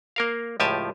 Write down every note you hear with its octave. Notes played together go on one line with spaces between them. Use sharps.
A#3 A#4 F5
C#2 A2 F3 G4 G#5 A5